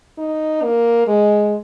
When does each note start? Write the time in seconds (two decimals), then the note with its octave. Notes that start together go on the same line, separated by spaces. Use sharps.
0.18 D#4
0.63 A#3
1.07 G#3